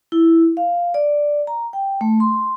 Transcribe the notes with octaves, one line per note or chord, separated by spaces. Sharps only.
E4
F5
D5
A#5
G5
A3
C6